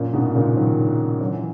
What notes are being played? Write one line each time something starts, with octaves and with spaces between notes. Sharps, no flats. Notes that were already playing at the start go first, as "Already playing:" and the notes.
Already playing: F#2 A#2
G#2 B2
A#2 C#3
D#3 F#3
F#3
E3